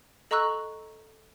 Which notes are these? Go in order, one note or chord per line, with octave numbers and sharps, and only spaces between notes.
A4 D#5 A#5 C#6 E6 F#6